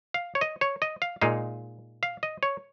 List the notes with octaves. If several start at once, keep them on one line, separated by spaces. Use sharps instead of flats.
F5
C#5
D#5
C#5
D#5
F5
A#2 G#3 D#4 F5
F5
D#5
C#5